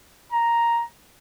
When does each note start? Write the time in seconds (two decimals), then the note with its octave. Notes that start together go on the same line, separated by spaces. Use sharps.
0.32 A#5